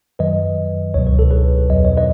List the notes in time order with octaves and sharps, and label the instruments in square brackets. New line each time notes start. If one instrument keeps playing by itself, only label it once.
[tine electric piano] F#2 D#3 F#3 B4 D#5
C#2 B2 F#3 C#5
B4
A4
G#4 B4
E2 B2 F#3 D#5
C#5
B4 D#5